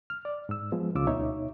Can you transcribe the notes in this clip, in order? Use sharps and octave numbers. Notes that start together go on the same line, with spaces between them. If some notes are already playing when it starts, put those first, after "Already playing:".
F6
D5
G#2 E6
F3 G#3 B3
C#2 C#3 F4 D6 E6
D2 B2 D#4 C#5 E5